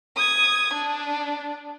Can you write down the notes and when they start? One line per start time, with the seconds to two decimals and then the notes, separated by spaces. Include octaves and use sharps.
0.16 D#6 G#6
0.74 D4